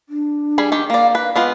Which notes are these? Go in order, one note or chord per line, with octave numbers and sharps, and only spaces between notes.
D4
G3 G#4 B5
D#3 G4
A#3 D5 F5
B4 F5
G#3 B3 F4